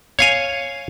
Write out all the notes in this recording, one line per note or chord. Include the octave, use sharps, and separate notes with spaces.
C#5 F5 G#5